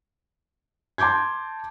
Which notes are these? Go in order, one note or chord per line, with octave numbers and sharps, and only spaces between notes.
A5 C6 D6 G6 G#6